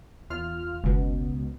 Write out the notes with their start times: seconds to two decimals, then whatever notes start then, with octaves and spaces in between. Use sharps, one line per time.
0.30 E2 F4 F6
0.84 F#1 C#2 B2